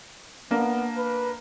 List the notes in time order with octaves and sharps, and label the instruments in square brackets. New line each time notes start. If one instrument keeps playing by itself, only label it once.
[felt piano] A#3 D4 [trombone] B3
[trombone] B4